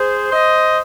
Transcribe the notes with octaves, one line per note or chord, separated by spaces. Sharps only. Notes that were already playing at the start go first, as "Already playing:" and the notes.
Already playing: G#4 C5
C5 D#5